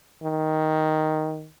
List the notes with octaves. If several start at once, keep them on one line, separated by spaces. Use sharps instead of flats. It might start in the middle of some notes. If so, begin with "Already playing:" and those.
D#3